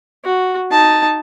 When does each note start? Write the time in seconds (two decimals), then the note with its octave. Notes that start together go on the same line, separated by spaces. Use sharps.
0.25 F#4
0.71 D#4 A5